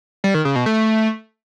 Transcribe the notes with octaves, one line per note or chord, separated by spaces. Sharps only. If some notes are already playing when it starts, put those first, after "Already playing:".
G3
D#3
C#3
B2
A3